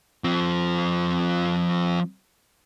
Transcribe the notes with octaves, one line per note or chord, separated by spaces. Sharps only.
F3 C4